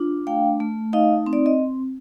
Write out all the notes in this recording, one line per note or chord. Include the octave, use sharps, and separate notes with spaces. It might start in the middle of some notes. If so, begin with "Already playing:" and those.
Already playing: D4 F4
A3 F5 G5
A3
D#4 D#5 F5
C4
D5
D#5